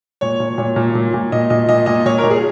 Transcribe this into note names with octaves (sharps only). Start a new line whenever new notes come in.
A#2 C#5
A#2
A#2 C#5
A#2
A#2
A#2
A#2 D#5
A#2 D#5
A#2 D#5
A#2 D#5
A#2 C#5
A#4
A#2
G#4